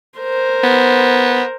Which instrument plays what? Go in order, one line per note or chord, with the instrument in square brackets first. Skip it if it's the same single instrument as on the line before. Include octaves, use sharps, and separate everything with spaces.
[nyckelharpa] A#4 C5
[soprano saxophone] B3